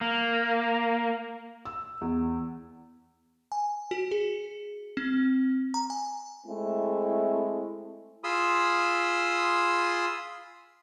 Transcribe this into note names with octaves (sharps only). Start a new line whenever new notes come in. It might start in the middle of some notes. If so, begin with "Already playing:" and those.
A#3
E6
E2
G#5
F#4
G#4
C4
A#5
G#5
G#3 A3 C4 E4
F4 G#4 B5 C6 D#6 E6